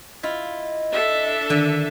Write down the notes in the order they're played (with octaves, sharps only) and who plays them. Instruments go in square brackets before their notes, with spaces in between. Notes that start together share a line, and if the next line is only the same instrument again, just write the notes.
[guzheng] E4 F4 [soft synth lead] D#5
[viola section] D4 A4 E5
[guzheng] D3 [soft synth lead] D#3